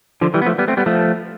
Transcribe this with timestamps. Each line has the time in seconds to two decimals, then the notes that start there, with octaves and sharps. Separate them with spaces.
0.21 D3 F3
0.34 E3 G3
0.42 B3
0.46 F3 A3
0.58 G3 B3
0.68 A3 C4
0.77 G3 B3
0.86 F3 A3